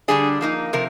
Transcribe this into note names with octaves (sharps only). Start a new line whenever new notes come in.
D3 G3 D4 G#4
F3 A#3 D#4
C3 F3 A#4